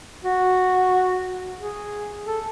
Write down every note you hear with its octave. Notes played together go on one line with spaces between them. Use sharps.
F#4
G#4
A4